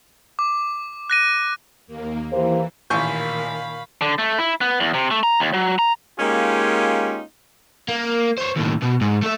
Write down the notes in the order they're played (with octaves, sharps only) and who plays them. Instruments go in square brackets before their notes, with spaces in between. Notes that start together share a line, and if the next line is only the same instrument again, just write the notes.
[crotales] D6
F#6 A#6 D#7
[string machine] D#2 A#3
[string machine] E3 [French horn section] A#3 G4 C5
[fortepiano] A1 [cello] A#2 D#3 [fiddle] F5 B5 [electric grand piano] G#5 C#6 G6
[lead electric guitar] D3
A3
E4
B3
E2
C3
A3
A#5
D#2
F#3
A#5
[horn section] G#3 A#3 C#4 D#4 F4 G4
[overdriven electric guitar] A#3
C5 C#5
D#2 A2
B2
G#2
A3 E5